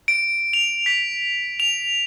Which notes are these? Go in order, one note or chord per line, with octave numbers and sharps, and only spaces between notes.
D7
F7
B6
F7